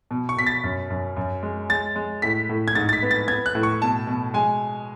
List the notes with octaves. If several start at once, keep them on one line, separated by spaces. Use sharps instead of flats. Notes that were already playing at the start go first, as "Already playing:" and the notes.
B2
C#6
B2 B6
A6
F#2
F#2
F#2
G#3
G#3 A6
G#3
A2 B6
A2
G#6
G#2 A6
A6
B6
B3
A6
B3 G#6
F#6
A2
C#6
B2 A5
B2
G#3 G#5